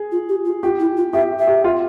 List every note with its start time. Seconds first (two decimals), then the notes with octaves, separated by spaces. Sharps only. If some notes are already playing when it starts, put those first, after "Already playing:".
Already playing: G#4
0.12 F4
0.29 G4
0.45 F4
0.63 F4 G4
0.80 E4
0.97 F4
1.13 G4 E5
1.39 E5
1.47 G4
1.64 F4